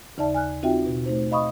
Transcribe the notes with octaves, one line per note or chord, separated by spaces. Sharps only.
D#2 C#3 D#4 D5 E5 A5
G#5 F6 F#6
C4 D#4 F4 F#4 E5 G5
B2
A3 D#4 C5
D#5 F5 B5 C#6 D#6